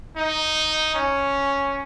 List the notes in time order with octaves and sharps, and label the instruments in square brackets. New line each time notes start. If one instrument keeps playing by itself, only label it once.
[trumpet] D#4
C#4